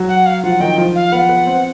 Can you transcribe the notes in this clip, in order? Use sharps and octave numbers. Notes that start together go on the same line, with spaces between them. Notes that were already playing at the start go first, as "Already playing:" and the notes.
Already playing: F#3 F#4
F#5
F5
F3 F4 F#5
D#3 D#4 G5
F3 F4
F5
B3 B4 F#5
B3 B4
C4 C5